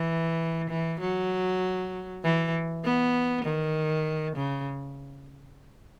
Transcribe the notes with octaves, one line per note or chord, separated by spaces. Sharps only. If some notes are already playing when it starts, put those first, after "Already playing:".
Already playing: E3
E3
F#3
E3
B3
D#3
C#3